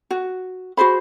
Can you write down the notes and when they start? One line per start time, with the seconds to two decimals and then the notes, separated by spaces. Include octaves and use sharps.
0.11 F#4
0.77 F#4 G#4 C5 B5